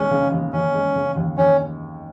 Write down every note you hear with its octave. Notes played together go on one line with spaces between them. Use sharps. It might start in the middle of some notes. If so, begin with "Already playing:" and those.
Already playing: D#2 G#3 C#4
C#3
D#2
D#2 C#4
G#3
C#3
D#2
D#2 C#4